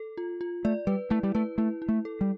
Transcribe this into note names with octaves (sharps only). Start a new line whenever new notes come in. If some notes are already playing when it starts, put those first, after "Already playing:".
Already playing: A4
F4
F4
A3 D5
G3 B4
A3 E4
G3
A3 B4
A3 E4
E4
A3
A4
G3